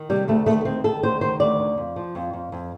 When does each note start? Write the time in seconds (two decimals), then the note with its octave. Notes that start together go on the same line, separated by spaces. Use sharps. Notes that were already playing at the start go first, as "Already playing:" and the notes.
Already playing: D#3
0.09 C3 G3
0.28 D2 A3
0.46 D#3 A3
0.65 D2 C4
0.84 D#3 A4
1.03 D2 C5
1.21 D#3 C5
1.40 D2 D5
1.59 D3
1.78 F2
1.96 F3
2.15 F2
2.33 F2
2.52 F2